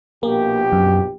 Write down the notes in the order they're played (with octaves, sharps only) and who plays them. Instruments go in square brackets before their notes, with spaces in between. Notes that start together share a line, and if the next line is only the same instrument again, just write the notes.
[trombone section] A#1 B2 G4 [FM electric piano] A#3
[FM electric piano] F#2